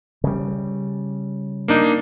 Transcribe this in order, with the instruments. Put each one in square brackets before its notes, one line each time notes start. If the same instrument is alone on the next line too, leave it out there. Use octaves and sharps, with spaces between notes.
[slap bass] C#3 G3
[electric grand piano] A#3 D4 D#4